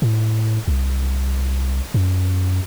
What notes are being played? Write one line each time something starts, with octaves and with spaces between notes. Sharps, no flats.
A2
C2
F#2